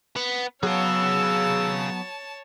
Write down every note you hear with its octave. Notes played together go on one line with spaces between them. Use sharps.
B3
F#3 B3 G#4 C#5 F5 A5 E6